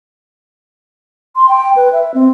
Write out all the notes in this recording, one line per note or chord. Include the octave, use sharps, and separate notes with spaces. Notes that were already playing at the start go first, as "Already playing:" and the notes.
C6
G5
B4
E5
C4